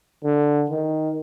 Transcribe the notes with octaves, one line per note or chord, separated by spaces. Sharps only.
D3
D#3